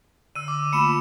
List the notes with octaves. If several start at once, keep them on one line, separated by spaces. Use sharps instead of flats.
D3 E6 D#7
D6
A3 A#3 F4 B5 C#7 E7